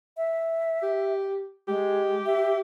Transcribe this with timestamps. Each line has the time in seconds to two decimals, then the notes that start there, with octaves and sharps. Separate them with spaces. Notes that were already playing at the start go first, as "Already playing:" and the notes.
0.17 E5
0.82 G4
1.68 G#3 G4
2.26 E5